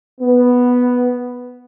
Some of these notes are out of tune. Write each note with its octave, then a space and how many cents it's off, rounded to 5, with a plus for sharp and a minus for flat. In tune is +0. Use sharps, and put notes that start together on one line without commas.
B3 +0